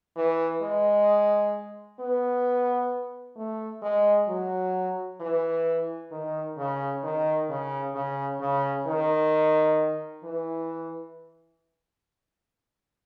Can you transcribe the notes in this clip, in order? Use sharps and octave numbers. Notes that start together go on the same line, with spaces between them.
E3
G#3
B3
A3
G#3
F#3
E3
D#3
C#3
D#3
C#3
C#3
C#3
D#3
E3